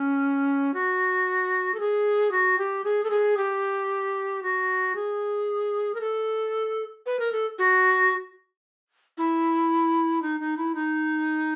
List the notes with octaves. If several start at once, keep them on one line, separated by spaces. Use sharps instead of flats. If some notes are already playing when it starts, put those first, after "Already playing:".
Already playing: C#4
F#4
A4
G#4
F#4
G4
G#4
A4
G#4
G4
F#4
G#4
A#4
A4
B4
A#4
A4
F#4
E4
D#4
D#4
E4
D#4